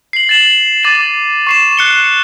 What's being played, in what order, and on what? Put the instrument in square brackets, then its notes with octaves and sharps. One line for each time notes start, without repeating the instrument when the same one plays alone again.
[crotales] C7 F#7
A6 C7 E7 F#7
D6 A6 D#7 F#7
C#6 C7 E7
F#6 C#7 G7